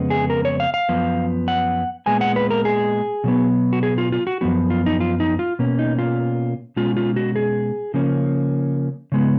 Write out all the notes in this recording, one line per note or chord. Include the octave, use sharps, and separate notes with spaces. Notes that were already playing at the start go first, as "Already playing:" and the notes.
Already playing: F2 C#3 G#3 B3
G#4
A#4
C#5
F5
F5
F#2 F3 B3
F#5
A#2 G#3 B3 G#5
F#5
B4
A#4
G#4
B2 F#3 B3
F#4
G#4
F4
F4
F#4
F#2 F3 B3 F#4
F4
D#4
F4
D#4
F4
B2 A#3 C#4
D#4
F4
B2 G#3 C#4 F4
F4
F#4
G#4
C#3 F3 A#3 C#4
C#3 G#3 B3